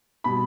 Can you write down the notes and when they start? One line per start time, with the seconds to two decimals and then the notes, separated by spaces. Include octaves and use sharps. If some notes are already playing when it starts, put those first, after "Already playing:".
0.24 B2 G3 B5